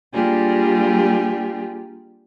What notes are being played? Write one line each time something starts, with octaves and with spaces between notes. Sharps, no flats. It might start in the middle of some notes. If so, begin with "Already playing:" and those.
G3 A#3 D4 F4 G4 G#4